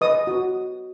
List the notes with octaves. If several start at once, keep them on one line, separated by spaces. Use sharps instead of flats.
B4 D#5 D#6
F#4